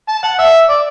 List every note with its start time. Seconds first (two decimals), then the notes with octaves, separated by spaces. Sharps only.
0.09 A5
0.23 F#5
0.39 E5
0.69 D5